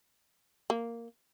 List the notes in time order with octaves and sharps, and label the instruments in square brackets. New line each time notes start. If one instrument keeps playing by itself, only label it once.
[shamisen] A#3